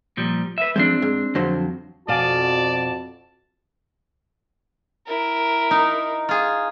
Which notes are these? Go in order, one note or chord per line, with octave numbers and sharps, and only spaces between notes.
A#2 F3 G3
B4 E5
G#2 F3 G#3 C4 D4
G#2
F2 D3 F#3 C5
F2 B2 F#4 D5 F5 G#5 A5
E4 A#4
D#4
F4 G#4